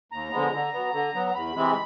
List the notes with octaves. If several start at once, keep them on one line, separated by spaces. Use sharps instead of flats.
D#2 A#5
D3 F3 G#3 B3
D3
F#3 B3
D3
F#3 B3
A#5
E2 B5
C3 E3 G#3 C4